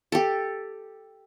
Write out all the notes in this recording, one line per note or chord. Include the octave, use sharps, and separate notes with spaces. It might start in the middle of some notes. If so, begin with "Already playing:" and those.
G4 A4